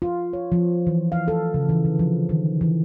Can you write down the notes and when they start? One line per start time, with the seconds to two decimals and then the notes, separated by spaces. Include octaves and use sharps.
0.02 F4
0.33 C#5
0.52 F3
0.87 E3
1.12 F5
1.28 A4
1.54 C#3
1.69 E3
1.85 D3
1.99 F3
2.29 D#3
2.61 E3